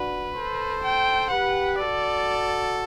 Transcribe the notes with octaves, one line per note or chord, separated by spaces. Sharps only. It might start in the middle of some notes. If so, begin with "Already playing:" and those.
Already playing: D4 F#4 B4
A4 C5
G5
G4 B4 F#5
F#4 A4 D5